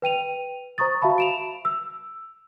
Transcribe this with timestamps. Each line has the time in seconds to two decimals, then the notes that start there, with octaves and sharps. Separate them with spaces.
0.02 B4 G5 D#7 F7
0.78 C5 A#5 C#6 D#6 A6
1.02 F#4 E5 F5 A5 B5
1.18 D7 E7 F7
1.65 E6